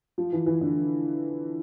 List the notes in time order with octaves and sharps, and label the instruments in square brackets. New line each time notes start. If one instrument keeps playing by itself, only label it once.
[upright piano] F3
E3
E3
D3